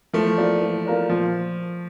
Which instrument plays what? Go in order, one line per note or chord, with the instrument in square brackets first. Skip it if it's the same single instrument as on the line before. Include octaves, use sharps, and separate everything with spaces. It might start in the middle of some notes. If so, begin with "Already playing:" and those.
[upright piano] E3 [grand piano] F3 A3
[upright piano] A#3 F4 A#4 D5
E3
A#3 F4 A#4 D5
[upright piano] A#2 [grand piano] F3